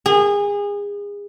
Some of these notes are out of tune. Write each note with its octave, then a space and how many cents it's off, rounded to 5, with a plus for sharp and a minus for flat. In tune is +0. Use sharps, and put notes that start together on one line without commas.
G#4 -30